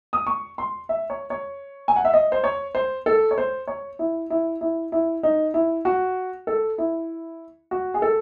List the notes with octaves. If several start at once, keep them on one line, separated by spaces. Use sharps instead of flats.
D#6
C#6
C6
E5
C#5
C#5
G#5
F#5
E5
D#5
C5
C#5
C5
A4
C#5
C5
C#5
E4
E4
E4
E4
D#4
E4
F#4
A4
E4
F#4
G#4
A4